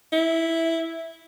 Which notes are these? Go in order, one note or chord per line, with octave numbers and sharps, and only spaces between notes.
E4